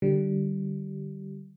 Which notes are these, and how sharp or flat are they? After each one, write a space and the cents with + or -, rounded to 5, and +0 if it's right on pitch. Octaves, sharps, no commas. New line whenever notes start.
D3 +20 G3 -20